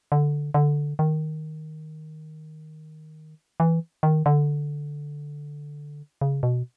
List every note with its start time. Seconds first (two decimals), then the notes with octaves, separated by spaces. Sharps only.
0.12 D3
0.54 D3
0.99 D#3
3.60 E3
4.03 D#3
4.26 D3
6.21 C#3
6.43 B2